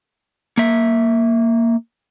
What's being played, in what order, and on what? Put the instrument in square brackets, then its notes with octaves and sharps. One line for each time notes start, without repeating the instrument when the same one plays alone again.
[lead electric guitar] A#3 E5